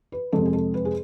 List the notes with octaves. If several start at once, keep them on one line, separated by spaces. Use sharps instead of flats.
B4
F2 C3 G#3 A4
G#4
A4
B4
G#4